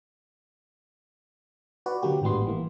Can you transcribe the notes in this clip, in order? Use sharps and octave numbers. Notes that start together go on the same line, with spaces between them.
F#4 B4 D5
D3 F#3 A#3 G4
G#1 A2 G3 B3 C6
E3 A#3